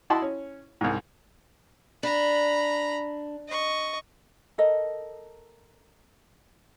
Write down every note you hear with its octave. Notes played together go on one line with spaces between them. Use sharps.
E4 F#4 D#5 A5 B5 C6
C#4
C2 G#2
D4 A#5 B5
D#5 C#6
A4 A#4 D#5